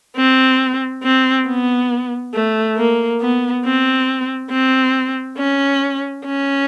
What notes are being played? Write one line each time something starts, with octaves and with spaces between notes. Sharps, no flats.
C4
C4
B3
A3
A#3
B3
C4
C4
C#4
C#4